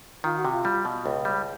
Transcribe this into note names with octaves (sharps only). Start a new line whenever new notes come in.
D#3 F4
F#4
C3
F4
G3
B2
C#2
G3